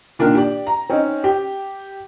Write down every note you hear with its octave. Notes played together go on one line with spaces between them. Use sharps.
A#2 D#3 D4 A#4
G4 D5
A#5
C4 C#4 D#4
G4